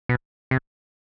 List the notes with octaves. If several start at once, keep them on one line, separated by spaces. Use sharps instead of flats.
B2
C3